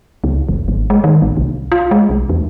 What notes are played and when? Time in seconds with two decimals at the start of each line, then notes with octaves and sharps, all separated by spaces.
0.24 C#2
0.49 F1
0.68 G#1
0.90 G#3
1.04 D#3
1.22 A1
1.37 C2
1.72 F4
1.91 G#3
2.10 B1
2.29 E2